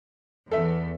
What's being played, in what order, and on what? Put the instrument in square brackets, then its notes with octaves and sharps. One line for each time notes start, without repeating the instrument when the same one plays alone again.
[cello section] E2 [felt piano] A4 E5